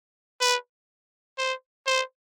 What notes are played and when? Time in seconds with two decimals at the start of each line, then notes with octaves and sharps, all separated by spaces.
0.41 B4
1.38 C5
1.87 C5